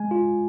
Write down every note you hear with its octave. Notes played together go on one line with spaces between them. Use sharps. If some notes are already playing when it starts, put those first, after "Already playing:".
Already playing: G#3 G#5
F4